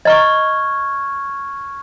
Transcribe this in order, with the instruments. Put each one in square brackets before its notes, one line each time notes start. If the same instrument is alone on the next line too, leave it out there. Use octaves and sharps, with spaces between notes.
[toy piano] D#5 A#5 [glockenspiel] C#6 F6 G#6